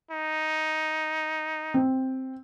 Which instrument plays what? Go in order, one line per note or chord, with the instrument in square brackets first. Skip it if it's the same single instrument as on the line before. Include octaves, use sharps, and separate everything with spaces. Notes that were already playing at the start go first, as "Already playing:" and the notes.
[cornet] D#4
[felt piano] C4